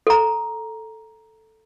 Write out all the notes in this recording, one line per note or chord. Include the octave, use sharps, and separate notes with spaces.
A4 A#5